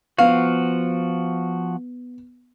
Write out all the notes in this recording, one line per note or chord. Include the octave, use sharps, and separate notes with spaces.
F3 B3 F#4 F5